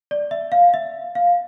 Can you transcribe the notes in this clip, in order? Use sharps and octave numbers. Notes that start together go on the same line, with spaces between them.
D5
E5
F5
E5
F5